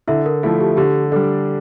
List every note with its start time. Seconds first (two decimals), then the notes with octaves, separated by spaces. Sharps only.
0.08 D3 E4 E5
0.26 A#4
0.43 F3 A3 E4 A4
0.61 G4
0.77 D3 G4
1.12 G3 D4 A4